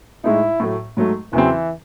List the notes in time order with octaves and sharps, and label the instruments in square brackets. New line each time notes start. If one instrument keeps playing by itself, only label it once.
[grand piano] A2 G#3 D#4 [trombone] E4
[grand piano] A2 F#3 A3
G#2 F#3 A3
[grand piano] E2 C#3 F#3 C4 [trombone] E3